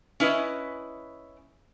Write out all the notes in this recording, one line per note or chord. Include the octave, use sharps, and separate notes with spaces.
C#4 E4 B4 D#5